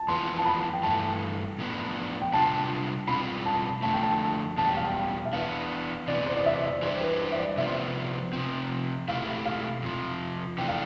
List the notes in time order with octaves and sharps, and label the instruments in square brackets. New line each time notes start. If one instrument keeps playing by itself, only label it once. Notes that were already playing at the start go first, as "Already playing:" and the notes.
Already playing: [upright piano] A5
[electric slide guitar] F2 E3 B3 F4 [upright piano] C6
[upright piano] A5
B5
G5
[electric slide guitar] G2 E3 A3 [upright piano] A5
[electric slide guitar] A2 F3 B3 D4
[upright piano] G5
[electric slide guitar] C3 G3 D4 F4 [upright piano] A5
[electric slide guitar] B2 G3 C4 F4 [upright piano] B5
[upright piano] A5
[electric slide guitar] F2 D3 A3 [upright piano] A5
[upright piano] G5
A5
[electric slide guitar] E2 B2 G3 [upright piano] A5
[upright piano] G5
F5
G5
E5
[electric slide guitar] E3 B3 D4 [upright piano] F5
[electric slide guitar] C3 E3 B3 [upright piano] D5
[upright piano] C5
D5
E5
D5
[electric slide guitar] E3 G3 D4 G4 [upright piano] C5
[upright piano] B4
C5
E5
D5
[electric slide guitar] C3 F3 B3 F4 [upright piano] E5
[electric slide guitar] C3 F3 C4
[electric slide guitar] B2 A3 C4 E4 G4 [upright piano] F5
[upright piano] F5
[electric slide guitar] F2 C3 F3
[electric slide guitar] C3 E3 A3 D4 [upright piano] G5
[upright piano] F5